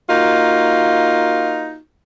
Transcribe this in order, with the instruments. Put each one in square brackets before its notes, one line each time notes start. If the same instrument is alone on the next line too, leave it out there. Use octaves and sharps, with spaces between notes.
[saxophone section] A#3 D#4 F4 F#4